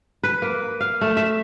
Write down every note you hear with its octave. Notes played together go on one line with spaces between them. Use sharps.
B4
A#3
F5
A3
E5